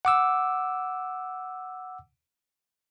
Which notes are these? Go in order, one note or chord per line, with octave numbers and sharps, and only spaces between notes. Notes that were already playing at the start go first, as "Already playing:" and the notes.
F#5 D6 E6